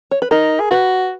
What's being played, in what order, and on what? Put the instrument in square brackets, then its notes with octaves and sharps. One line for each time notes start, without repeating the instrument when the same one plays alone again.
[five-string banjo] C#5
B4
[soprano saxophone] D#4 [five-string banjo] A#4
[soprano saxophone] G#4
[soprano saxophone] F#4 [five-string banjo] B4